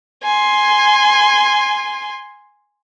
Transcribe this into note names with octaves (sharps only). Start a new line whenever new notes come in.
G#5 C6